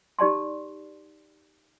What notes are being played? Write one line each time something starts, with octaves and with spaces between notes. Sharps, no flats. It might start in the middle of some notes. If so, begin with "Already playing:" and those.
D#4 G4 D5 A5 C6